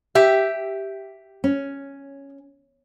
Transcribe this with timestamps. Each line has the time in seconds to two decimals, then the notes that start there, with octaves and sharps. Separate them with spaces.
0.15 G4 E5
1.44 C#4